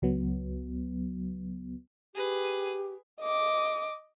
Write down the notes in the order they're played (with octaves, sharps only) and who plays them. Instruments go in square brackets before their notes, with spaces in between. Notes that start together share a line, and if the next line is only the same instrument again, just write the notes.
[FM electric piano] C#2 F#3 B3
[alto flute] G4 [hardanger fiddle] G#4 B4
[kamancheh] D#5 D6